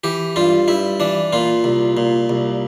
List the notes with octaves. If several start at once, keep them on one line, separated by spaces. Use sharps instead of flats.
E3 G4
G2 F4
G2 E4
E3 D4
A#2 F4
C2
A#2
C2